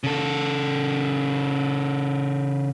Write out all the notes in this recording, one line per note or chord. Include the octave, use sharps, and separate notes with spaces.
C#3 A4